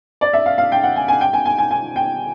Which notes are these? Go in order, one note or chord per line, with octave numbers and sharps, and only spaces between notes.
D5
E5
F5
F5
G5
F#5
G#5
G#5
G5
G#5
G#5
G#5
G#5
G5